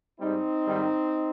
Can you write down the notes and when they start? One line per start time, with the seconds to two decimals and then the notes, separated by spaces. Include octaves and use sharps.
0.19 G#2 G3 C4 D#4
0.66 G#2 D#3 G3